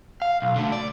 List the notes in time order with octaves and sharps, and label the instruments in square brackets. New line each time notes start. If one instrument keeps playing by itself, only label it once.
[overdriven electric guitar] F5
B1
D3 A3
D5